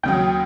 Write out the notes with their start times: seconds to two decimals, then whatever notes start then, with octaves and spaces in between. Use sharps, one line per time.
0.03 D#2 C#3 F#3 G5